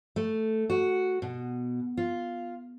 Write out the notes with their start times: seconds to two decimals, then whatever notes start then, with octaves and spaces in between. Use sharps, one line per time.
0.16 A3
0.70 F#4
1.22 B2
1.97 F4